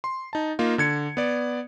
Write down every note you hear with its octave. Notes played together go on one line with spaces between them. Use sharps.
C6
D#4 A5
A#3 D#4 F4
D3 G#6 C#7
B3 D5